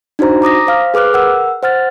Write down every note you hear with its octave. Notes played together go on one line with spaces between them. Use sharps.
D4 D#4 F#4 C5 A#5
A#5 D6 D#6 A#6
C5 F5 F6
G#4 B4 D6 F6 F#6
A#4 F#5 E6
C5 F#5 F6 A6